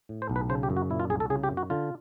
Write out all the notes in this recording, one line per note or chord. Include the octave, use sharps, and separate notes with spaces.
A2
C5
B1
B4
C#3 C5
G4
F#2
F#4
A#2 E4
F4
C2 G#4
A4
C#3 G#4
G4
F#2
F#4
D3 F4